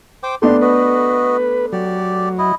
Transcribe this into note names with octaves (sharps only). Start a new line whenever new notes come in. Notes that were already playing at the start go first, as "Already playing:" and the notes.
C5 G5 D6
A3 B3 D4 G4 C6
F#4 B4 D#5
F#3 G4 D5
E4 D#5